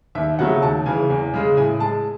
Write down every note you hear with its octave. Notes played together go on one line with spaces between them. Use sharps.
D#2 E5
C#3 F#3 A3 F#5
D#2 A5
C#3 E3 G#5
E2
C#3 G#3
A2 G#5
G#3 A5